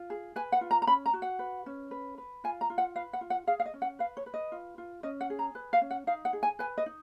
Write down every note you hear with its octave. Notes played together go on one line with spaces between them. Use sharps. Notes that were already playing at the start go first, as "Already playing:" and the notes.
Already playing: F4
G#4
B4 G#5
F#5
F4
A#5
A#5
C#4 B5
A#5
F#4
F#5
B4
C#4
B4
B4
F4 G#5
A#5
F4
F#5
B4 F5
F#5
F4
F#5
G#4 F5
F5
D#5
C#4
F#5
B4 F5
C#5
B4
D#5
F4
F4
C#4 D#5
F#5
G#4
A#5
B4
F5
C#4
F#5
D#4 F5
F#5
G#4
G#5
B4 G#5
D#5
D#4